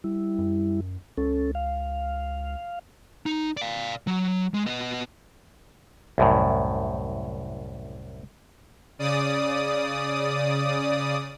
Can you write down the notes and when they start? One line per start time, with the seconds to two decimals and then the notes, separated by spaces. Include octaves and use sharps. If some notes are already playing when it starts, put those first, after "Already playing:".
0.04 G3 E4
0.39 F#2
1.17 C#2 C#4 A4
1.55 F5
3.26 D#4
3.57 D5 F5
4.07 F#3
4.54 G#3
4.67 B3 D#5
6.18 C2 F#2 A2
8.99 C#3 D5 D#6